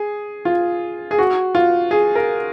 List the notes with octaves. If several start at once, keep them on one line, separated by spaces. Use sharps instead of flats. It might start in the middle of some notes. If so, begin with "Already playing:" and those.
Already playing: G#4
F4
G#4
F#4
F4
G#4
A#4